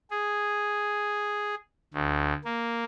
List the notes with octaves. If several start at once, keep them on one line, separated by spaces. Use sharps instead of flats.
G#4
D2
A#3